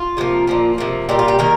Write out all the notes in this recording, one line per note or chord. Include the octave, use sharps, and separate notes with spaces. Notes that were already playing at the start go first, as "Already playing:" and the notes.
Already playing: F4
C3 F3 A#3
A#2 F3 A#3
C3 F3 A#3
A#2 G3 A#3 G4
F4
G4
D#3 G3 A#3 A#4